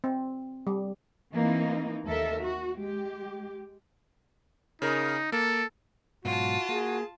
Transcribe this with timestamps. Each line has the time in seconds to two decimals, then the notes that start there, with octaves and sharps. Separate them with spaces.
0.04 C4
0.67 G3
1.31 E3 A#3 C4 D#4
2.05 D#2 A4 A#4 E5
2.42 F#4
2.77 G#3 G4
4.82 C#3 D#4 A#4
5.32 A#3 A4
6.25 G#2 B2 F#3 F4 F#4 A5
6.69 A#3 G#4